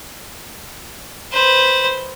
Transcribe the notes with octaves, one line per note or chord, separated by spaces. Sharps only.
B4 C5